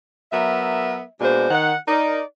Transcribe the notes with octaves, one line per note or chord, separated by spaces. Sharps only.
F#3 B3 A#4 E5
B2 G#3 A#3 D4 C5 D5
D#3 F#5
D#4 A#4 D5